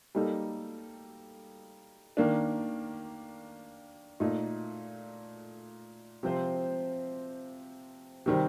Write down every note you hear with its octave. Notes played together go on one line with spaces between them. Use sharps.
G3 A#3 D#4 A4
D#3 A#3 D4
A#2 A3 D#4
C3 F3 C4 F4 C5
C3 D#3 G3 C4